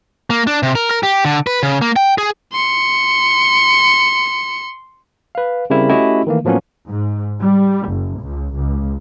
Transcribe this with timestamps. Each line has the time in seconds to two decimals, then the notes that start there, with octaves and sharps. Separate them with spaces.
0.30 A#3
0.47 D4
0.63 C3
0.75 A#4
0.90 A#4
1.03 G4
1.25 D3
1.47 B4
1.63 C#3
1.82 A#3
1.96 G5
2.18 G#4
2.53 C6 C#7
5.35 B4 F5
5.70 C#3 G3 C4 E4 A#4
5.89 A3 C#4 E4 F#4 G4 D#5
6.27 D#3 E3 A3 A#3
6.45 A2 F3 F#3 A#3 B3 C#4
6.87 G#2
7.40 G3
7.89 F#1
8.20 C#2
8.55 C#2